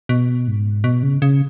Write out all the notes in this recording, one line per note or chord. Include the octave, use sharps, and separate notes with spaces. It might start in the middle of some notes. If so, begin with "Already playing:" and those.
B2
G#2
B2
C#3
C#3